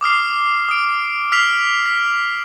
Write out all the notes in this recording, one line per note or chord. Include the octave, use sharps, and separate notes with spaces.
D6 D#6 F6 C7
D#6 D7
E6 F6 B6 C7 F7
B6